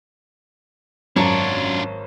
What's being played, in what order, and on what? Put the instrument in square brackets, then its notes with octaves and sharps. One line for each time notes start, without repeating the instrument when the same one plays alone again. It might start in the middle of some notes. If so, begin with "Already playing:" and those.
[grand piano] G#1 A5 A#5 [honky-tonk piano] F#2 [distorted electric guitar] D4 F4 [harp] C#5